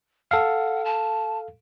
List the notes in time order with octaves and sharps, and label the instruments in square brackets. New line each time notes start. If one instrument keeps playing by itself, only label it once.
[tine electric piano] A4 F5 [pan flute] F#5
[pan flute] A5